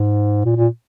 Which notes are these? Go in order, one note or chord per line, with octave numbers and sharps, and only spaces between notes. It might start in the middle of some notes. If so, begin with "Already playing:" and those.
Already playing: G#2
A#2
A#2